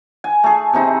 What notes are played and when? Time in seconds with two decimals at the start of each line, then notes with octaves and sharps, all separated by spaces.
0.24 G#5
0.44 A3 G#4
0.73 C3 C4 D#4 E4